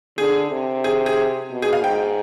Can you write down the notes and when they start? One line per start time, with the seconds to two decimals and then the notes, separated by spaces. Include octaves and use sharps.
0.18 D3 G#4
0.51 C3
0.84 G#4
1.06 G#4
1.51 B2
1.62 G#4
1.73 F5
1.84 G#2 G5